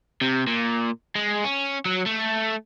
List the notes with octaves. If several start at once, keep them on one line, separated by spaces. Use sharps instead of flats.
C3
A#2
G#3
C#4
F#3
A3